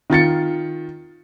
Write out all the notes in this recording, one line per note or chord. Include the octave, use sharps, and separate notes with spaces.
D#3 F4 A6 C#7